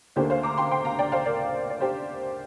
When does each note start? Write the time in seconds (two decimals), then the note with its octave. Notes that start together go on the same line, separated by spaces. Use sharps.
0.16 D2 D3 A#3 G4 C5
0.30 C5 F5
0.43 A#5 D6
0.58 G5 C6
0.71 G5 C6
0.85 F5 A#5
0.99 D5 G5
1.12 C5 F5
1.26 A#4 D5
1.70 D5
1.81 G4 C5